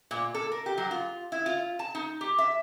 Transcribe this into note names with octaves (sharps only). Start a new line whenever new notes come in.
A#2
A4
A#4
G4
F#3
F4
E4
F4
A5
D#4
G4
E5